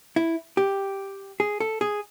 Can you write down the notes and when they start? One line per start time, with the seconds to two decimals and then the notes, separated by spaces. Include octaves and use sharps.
0.16 E4
0.57 G4
1.40 G#4
1.60 A4
1.81 G#4